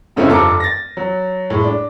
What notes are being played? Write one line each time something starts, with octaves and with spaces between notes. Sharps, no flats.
G#2 C#3 A3 C4 D#4 E4
F1 G2 F3 A4 A#5 D6
A6 A#6
F#3
A2 G#3
D4